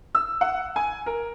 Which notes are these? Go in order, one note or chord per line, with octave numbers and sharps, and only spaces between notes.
E6
F#5
G#5
A#4